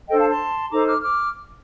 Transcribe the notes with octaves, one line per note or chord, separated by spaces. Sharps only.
D4 A4 C5 D#5 G5
F5 A5
A5 C6
D#4 A4 C5 A#5 D6
D6 F6
D6 F6